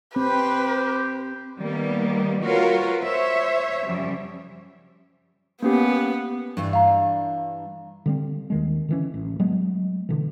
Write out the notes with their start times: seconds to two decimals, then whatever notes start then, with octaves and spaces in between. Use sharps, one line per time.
0.16 C4 G4 B4 C5
1.58 D#3 G3 A#3 B3
2.43 F4 F#4 A#4 B4 C#5
3.01 C5 C#5 E5
3.85 F#2 C#3 F3 G3
5.63 A#3 B3 C#4 G4
6.57 G2 E3 D4
6.73 F5 A#5
8.06 D3 G3 C4
8.50 D#2 D#3 G#3
8.89 D3 E3 C#4
9.14 A1
9.40 F#3 G#3 A3 B3
10.09 B2 D3 E3